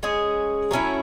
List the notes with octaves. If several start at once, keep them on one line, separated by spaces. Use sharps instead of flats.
G#3 C#4 G#4
F#3 A3 C#4 E4